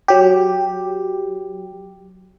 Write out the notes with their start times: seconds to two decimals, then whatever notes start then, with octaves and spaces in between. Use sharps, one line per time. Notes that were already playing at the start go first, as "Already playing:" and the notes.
0.08 F#3 G4